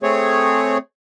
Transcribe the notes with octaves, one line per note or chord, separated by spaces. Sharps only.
A3 C4 G#4 C#5